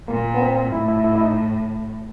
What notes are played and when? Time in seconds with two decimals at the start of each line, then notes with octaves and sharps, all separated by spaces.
0.08 A#2 A#3
0.34 B3
0.41 C4
0.72 A2 E4
0.89 E4
1.04 E4
1.16 E4
1.21 D#4